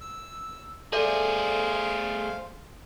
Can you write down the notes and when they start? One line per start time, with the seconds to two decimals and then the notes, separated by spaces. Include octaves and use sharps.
0.01 E6
0.92 A3 G#4 A4 C5 D5 E5 F5